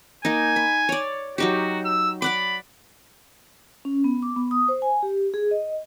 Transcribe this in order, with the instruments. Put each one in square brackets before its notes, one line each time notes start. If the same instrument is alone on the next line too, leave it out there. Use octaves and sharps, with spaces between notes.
[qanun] A#3 D#4 [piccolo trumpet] G#5
[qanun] B5
C#5 D5
[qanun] F#3 D#4 G4 [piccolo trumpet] F#4
[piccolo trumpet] E6
[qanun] D5 F#5 D6 [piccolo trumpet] B5
[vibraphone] C#4
B3
D6
B3
D#6
C5
G#5
G4
G#4
D#5